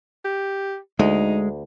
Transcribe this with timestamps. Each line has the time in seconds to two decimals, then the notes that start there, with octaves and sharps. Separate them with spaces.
0.25 G4
0.99 D2 G#3 D#4